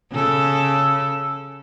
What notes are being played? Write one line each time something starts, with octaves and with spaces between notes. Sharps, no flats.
C#3 A4